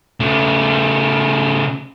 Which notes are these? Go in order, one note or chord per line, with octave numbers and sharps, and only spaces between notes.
C#3 A3